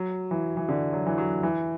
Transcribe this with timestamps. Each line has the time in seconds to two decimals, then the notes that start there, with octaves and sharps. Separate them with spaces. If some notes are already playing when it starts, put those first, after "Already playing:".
Already playing: F#3
0.31 E3
0.57 E3
0.69 D3
0.93 F#3
1.06 E3
1.18 F#3
1.43 E3